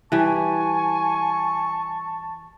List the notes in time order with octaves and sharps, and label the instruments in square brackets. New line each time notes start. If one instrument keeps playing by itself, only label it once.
[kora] E3 G3 [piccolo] G#5 [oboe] A5 [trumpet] C#6